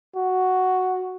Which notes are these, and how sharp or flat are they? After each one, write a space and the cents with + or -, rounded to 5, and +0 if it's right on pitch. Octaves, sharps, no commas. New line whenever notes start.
F#4 +0